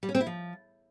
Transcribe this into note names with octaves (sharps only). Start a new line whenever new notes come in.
G3
C#4
C4
E4
F3